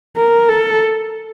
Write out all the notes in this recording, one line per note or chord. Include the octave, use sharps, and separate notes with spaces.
A#4
A4